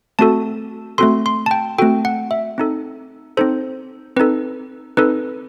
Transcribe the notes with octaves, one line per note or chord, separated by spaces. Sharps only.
A3 C4 F#4 A4 A5
A3 C4 F#4 A4 C6
C6
A5
G5
A3 C4 F#4 A4 G5
F#5
E5
C4 D#4 A4
C4 D#4 A4 C5
C4 D#4 A4 B4
C4 D#4 A4 B4